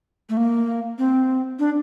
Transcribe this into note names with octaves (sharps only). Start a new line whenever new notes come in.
A3
A#3
C4
D4